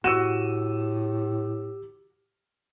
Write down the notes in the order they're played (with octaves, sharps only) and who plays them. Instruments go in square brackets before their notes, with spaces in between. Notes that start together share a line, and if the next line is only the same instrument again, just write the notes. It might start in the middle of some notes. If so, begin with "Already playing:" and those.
[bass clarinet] A2 [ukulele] F#4 [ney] G4 [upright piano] E6 D#7 E7